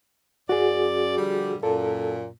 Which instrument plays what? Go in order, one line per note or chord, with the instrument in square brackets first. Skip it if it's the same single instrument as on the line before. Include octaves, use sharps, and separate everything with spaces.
[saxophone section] F#2 D5 [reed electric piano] F#4 G#4
[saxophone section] D3 F3 G3
[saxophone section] F#2 A#2 [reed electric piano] A4